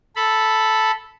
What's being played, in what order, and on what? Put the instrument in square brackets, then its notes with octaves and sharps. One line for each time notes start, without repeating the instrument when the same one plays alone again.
[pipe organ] A4 B5